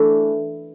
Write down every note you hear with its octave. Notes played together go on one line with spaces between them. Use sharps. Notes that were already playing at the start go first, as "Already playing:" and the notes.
Already playing: E3 A3 D4